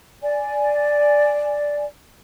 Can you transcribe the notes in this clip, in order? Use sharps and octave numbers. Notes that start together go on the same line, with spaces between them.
D5 G#5